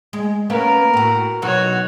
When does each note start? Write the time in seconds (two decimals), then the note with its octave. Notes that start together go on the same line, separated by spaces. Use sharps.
0.13 G#3
0.50 A#3 B3 C#4 A#4
0.94 A2 F#4
1.42 B2 F#3 D#4 F#4 C#5